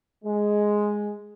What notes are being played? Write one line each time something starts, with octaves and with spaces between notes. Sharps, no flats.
G#3